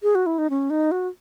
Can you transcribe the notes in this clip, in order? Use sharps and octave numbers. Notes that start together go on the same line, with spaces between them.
G#4
F#4
E4
D#4
C#4
D#4
F#4